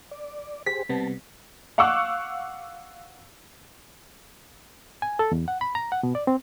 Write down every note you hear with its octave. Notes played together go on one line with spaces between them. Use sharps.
D5
G4 G#4 C5 B6
C3 G3 B3 A5
F5 F#5 C#6 D6 E6 F#6
G#5
A4
E2
F#5
B5
A#5
F#5
B2
D5
C4